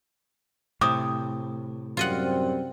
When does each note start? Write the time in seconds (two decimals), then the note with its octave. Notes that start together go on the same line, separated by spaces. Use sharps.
0.81 A2 C3 C4 D6 D#6
1.97 F#2 G3 C4 F4 D#5 F#5